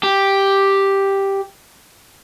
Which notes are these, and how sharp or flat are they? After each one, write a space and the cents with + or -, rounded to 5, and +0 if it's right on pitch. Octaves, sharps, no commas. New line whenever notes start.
G4 +0